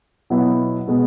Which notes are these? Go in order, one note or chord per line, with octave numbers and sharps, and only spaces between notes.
B2 F#3 B3 E4
B2 G#3 B3